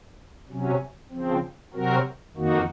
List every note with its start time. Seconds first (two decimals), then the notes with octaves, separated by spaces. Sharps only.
0.49 C3 F#3 C#4
1.11 C#3 F3 C4
1.74 C3 F#3 C4 F#4 A#4
2.36 F2 D#3 A#3 D#4 F#4